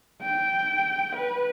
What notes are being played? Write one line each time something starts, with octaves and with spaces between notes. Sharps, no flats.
G5
B4